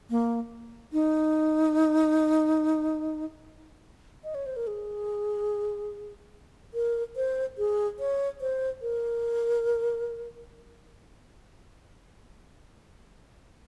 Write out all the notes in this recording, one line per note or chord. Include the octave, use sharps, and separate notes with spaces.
A#3
D#4
D#5
C#5
C5
A#4
G#4
A#4
C5
G#4
C#5
C5
A#4